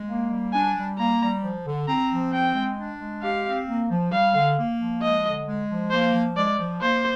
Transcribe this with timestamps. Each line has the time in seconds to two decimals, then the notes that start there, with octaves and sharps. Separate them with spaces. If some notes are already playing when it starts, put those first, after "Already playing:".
Already playing: G#3
0.08 A#3
0.30 G3
0.53 D4 G#5
0.76 G3
0.98 A#3 A#5
1.20 G3
1.42 F3
1.65 D3
1.87 C4 A#5
2.10 F3
2.33 C4 G5
2.55 G#3
2.77 D4
2.99 G#3
3.22 G4 F5
3.45 C4
3.67 A#3
3.90 F3
4.12 G3 F5
4.35 D3
4.57 A#3
4.80 F3
5.02 G#3 D#5
5.24 D3
5.46 G#3
5.69 F3
5.91 A#3 C5
6.14 F3
6.37 G#3 D5
6.58 F3
6.81 A#3 C5